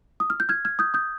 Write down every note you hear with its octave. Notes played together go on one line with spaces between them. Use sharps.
D#6
F6
G6
F6 G#6
F6 G#6
D#6 G6
D#6 G6